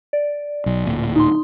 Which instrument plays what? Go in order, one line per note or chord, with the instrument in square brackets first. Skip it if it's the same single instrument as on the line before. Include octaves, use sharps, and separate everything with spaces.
[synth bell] D5
[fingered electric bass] B1
D1 A#2
[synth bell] D#4 C6